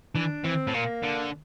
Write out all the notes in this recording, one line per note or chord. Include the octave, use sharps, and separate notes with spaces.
E3 D4
E3 C4
A2
A#2 A#3
D3